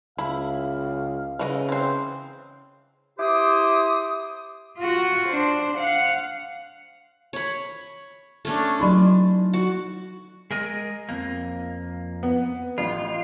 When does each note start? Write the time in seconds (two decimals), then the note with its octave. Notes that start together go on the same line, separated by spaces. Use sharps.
0.18 C#2 E4 F5 B5
1.39 C#3 E3 F#4 D#5
1.69 E3 C4 C5
3.19 E4 G4 C5 D6 D#6
4.78 F4 F#4
5.28 D4 C5
5.78 F5 F#5
7.33 C#5 B5
8.45 A3 C#4 D4
8.80 F#3 D#4 E4
9.53 F#4
10.51 G#3 A#4 D#5
11.09 F2 A#3
12.23 B3
12.78 A1 F4